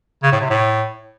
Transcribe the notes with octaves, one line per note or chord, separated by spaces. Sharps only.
C#3
A2
C3
A2